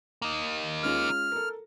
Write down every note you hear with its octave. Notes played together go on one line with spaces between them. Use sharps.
A#3 D#4
G#3 C#4 F4 F6
A4 A#4